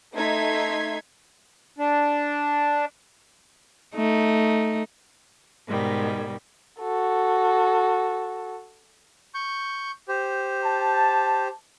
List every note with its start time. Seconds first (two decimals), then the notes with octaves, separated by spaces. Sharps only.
0.14 A3 D#4 E5 C6 G#6 B6
1.78 D4
3.95 A3 D#4
5.67 G#2 B2 D#3 G3
6.80 F#4 A4
9.34 C#6 G6
10.08 G4 C5
10.64 A5